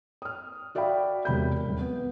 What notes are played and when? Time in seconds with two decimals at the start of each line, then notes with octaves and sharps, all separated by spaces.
0.22 D#6 F6
0.75 F#4 D5 E5 F5 G5 B5
1.25 E1 C3 B5 G6
1.68 D#1
1.81 B3